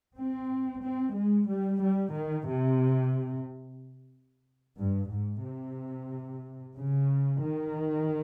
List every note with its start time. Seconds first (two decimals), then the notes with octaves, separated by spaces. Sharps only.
0.17 C4
0.82 C4
1.16 G#3
1.48 G3
1.82 G3
2.15 D#3
2.47 C3
4.78 G2
5.11 G#2
5.44 C3
6.76 C#3
7.41 D#3